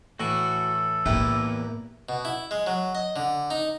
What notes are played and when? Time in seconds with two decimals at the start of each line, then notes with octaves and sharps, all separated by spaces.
0.20 A2 E3 F#4 A4 C#6
1.06 E2 A2 A#3 B3 E4 G4 B4
2.09 B2
2.25 E4
2.51 G#3
2.66 F#3
2.95 D#5
3.16 D3
3.50 D#4